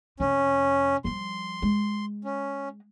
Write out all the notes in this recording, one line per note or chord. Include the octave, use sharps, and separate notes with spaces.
F2 C3 C#4
F3 G3 C6
G#3
C#4